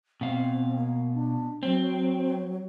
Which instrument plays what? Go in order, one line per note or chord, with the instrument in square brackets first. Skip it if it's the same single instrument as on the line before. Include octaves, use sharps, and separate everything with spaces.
[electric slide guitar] B2 F5 [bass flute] C4
[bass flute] A#3
D4
[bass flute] F#3 [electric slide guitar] C4